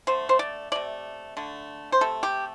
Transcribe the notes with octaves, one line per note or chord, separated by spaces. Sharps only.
D3 A3 C5
C5
D5
C3 A3 D5
D3 A3
C5
C3 A3 A4
G4